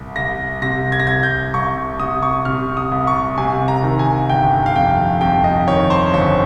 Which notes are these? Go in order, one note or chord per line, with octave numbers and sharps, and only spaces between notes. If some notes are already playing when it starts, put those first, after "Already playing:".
Already playing: C2
C2 A#6
C3 A#6
G#6
A#6
C2 G#6
G6
C2 C#6
C3 D#6
C#6
C3 F6
D#6
C2
C#6
C3 G#5
A#5
D#3
G#5
G1 G5
F5
F2 G5
F2 G5
D#5
D#3 C#5
C5
G1 C#5